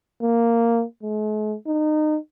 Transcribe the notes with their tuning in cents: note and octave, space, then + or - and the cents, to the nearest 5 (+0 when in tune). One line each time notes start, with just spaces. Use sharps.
A#3 -5
G#3 +45
D#4 -25